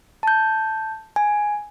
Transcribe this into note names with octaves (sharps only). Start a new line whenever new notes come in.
A5 G6
G#5